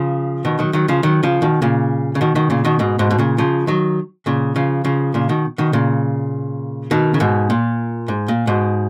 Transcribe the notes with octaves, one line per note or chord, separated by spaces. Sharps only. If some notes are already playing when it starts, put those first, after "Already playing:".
Already playing: C#3 F3
B2 D#3
D#3 F#3
D#3 F#3
C#3 F3
D#3 F#3
C#3 F3
B2 D#3
A#2 C#3
C#3
B2 D#3
B2 D#3
A#2 C#3
B2 D#3
G#2 B2
G#2 B2
B2
A#2 C#3
C#3 F3
D#3 F#3
A#2 C#3
C#3 F3
C#3 F3
A#2 C#3
B2 D#3
B2 D#3
A#2 C#3
B2 D#3
C#3
G#2 B2
A#2
G#2
A#2
G#2 B2